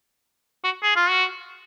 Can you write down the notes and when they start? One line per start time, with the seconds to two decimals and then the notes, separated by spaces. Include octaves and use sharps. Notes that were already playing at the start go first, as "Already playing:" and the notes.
0.64 F#4
0.83 G#4
0.96 F4
1.10 F#4